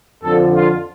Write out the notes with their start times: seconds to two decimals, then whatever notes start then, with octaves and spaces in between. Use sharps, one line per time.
0.22 F2 D3 F3 A4
0.56 F4